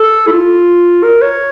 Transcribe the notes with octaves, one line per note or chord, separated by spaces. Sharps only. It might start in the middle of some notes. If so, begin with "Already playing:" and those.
Already playing: A4
E4
F4
A#4
C#5